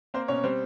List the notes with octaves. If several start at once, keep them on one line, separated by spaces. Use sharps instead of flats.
A#3 C4 C5
B2 C#4 C#5
G3 C4 C5